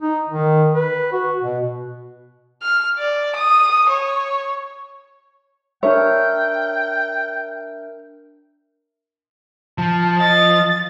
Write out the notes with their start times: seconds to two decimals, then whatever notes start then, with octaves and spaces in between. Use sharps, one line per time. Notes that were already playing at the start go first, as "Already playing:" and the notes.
0.02 D#4
0.29 D#3
0.75 B4
1.12 F#4
1.42 B2
2.63 F6
2.98 D5
3.35 D#6
3.89 C#5
5.83 D4 A#4 C#5 E5 G5
9.78 F3 A5
10.20 D#5 A6